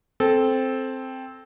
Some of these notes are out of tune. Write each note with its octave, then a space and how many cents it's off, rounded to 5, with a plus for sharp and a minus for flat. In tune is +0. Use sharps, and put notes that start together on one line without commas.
C4 +0 A4 -15